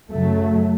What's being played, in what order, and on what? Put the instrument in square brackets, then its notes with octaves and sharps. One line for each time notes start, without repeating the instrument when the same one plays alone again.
[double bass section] F#2 C#3 F#3 A3